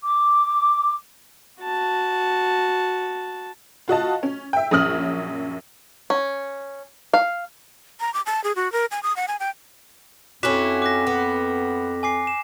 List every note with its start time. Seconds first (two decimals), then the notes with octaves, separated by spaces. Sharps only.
0.02 D6
1.62 F#4 A5
3.88 F4 F#4 D#5 A5
4.23 C#4
4.53 E5 G5
4.71 A#1 F#2 C#4 D#6 F6 F#7
6.10 C#4
7.14 F5
8.00 A#5
8.14 D6
8.26 A5
8.44 G#4
8.56 F#4
8.72 A#4
8.91 G#5
9.03 D#6
9.16 F#5
9.28 G#5
9.40 G5
10.43 F2 C#4 E4 F#4 D6 B6 E7
10.82 D6 F#6 A#6
11.07 B3
12.03 G#5 D6 C7
12.27 E7